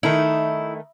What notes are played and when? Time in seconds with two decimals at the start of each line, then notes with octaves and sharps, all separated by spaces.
0.03 D#3 A3 D#4 E4